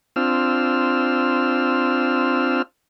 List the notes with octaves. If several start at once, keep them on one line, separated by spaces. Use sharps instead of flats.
C4 D4 F4 E6 F6